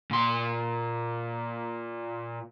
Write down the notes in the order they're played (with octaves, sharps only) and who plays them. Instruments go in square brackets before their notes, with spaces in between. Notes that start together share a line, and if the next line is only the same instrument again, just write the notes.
[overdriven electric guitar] A#2 C6